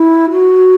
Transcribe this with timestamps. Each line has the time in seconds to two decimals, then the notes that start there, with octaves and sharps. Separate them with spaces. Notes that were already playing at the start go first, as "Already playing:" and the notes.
Already playing: E4
0.31 F#4